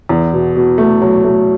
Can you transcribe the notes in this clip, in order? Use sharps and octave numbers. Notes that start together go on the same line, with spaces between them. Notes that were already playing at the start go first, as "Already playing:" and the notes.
E2
B2
B2
A3
F#3
A3